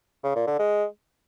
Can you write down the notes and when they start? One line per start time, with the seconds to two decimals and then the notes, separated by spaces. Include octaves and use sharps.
0.23 C#3
0.35 A#2
0.47 D3
0.59 G#3